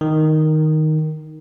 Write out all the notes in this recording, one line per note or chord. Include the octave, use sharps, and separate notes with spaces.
D#3